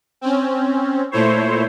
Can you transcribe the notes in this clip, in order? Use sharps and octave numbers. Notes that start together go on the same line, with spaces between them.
C4 C#4
A#2 A3 E4 C5 C#5